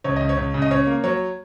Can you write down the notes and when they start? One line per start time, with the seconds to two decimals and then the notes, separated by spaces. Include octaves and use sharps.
0.04 C#2 C#5
0.16 C#2 D#5
0.29 C#5
0.37 C#2
0.54 C#3
0.62 D#5
0.71 C#3 C#5
0.87 A#3
1.04 F#3 C#5